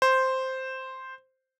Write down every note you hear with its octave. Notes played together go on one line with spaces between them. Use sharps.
C5